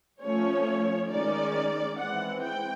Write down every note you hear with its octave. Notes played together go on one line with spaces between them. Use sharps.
F3 A3 C#4 C#5
D#3 G#3 C#4 D5
E3 G#3 C4 F#5
G5